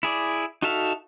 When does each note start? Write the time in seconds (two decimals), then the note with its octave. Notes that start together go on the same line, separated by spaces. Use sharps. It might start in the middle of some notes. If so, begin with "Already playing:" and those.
0.03 E4 G#4 D5
0.62 D#4 F#4 A4 E5 F5